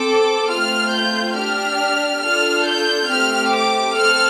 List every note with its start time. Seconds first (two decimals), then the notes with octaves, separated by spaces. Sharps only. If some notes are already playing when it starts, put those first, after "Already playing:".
Already playing: C4 A4 D6
0.51 A3 C4 F4 F6
0.95 G6
1.38 D4 G4 F6
2.24 D4 F4 A4 F6
2.67 G6
3.10 A3 C4 G4 F6
3.54 D6
3.97 C4 A4 F6